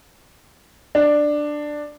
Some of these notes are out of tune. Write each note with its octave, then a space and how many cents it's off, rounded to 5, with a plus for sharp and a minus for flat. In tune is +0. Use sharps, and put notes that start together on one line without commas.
D4 +10